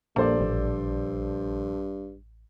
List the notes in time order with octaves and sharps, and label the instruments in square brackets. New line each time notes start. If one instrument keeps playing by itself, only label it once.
[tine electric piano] A#1 [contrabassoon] G2 [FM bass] A#3 [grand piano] A4 C5 D5
[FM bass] A1